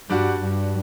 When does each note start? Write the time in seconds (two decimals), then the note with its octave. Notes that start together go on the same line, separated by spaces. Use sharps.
0.09 G2 G3 D4 F#4
0.41 G2